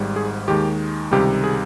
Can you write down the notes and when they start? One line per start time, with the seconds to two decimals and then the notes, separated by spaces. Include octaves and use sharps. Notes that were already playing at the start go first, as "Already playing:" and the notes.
Already playing: G#1 G#2 G3
0.16 G#4
0.48 D#2 D#3 G#3 G4
1.11 C#2 C3 D#3 G3 G4
1.44 G#4